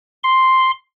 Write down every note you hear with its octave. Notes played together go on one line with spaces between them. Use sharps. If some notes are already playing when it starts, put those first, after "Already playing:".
C6